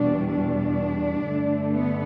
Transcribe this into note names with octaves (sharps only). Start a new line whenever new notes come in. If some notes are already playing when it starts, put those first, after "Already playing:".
Already playing: E2 B2 G3 D4
D4
G2 D3 A3
B3